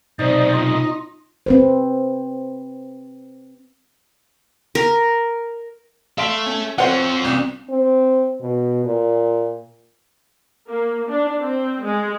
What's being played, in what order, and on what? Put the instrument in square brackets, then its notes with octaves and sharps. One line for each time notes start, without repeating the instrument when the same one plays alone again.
[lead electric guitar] B1 C3 [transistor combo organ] D#4 [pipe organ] C5 D5
[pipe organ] F4
[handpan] C4 B4 C5
[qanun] A#4
[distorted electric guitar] A4 E5 [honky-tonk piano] F5 C6 D7
[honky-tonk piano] C#4
[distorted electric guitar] C4 F4 [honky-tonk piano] C5 C#5 F#5
[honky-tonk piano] C2
[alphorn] C4
B2
A#2
[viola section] A#3
D4
C4
G#3